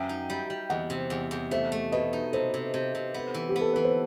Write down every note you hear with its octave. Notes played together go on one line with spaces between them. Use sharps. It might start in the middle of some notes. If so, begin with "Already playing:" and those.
Already playing: F#2 E5 G5
D#4
G3
G3
E2 D#5 F#5
C3
E2
E2
A3 C5 E5
A3
B2 B4 D#5
D#4
C3 A4 C5
C3
C3
C3
B3
E3
G4
B3
A4
E3 B4
C5